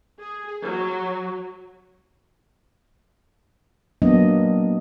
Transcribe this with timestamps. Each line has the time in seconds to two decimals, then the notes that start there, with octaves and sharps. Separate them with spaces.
0.21 G#4
0.65 F#3
4.02 F#3 A#3 B3 D4 D#5